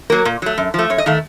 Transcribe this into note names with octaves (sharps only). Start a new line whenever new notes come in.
F#3 A#3 A#4
A#2
F#3 A3
F#2
F3 A3
F#2 C#5
D#5
D#3 A3 F5